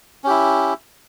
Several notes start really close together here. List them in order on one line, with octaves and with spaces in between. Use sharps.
C#4 G4 E4